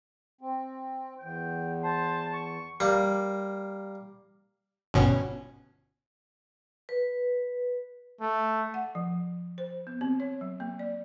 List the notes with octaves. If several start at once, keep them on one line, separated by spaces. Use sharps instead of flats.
C4
E2 G5
C5 A5
C#6
G3 A#3
G1 B2 C#4
B4
A3
F#5
F3
C5
B3
C4
C#5
F#3
A#3
D5